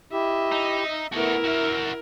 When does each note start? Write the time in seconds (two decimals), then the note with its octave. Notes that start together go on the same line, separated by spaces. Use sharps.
0.13 E4 G4 D#5 E5
0.52 D#4
1.13 A3 B3 E4 F#4 A4 A#4
1.45 F#4 E5 F6